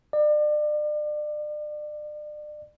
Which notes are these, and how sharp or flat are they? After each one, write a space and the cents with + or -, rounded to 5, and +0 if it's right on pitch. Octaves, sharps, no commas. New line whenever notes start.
D5 +35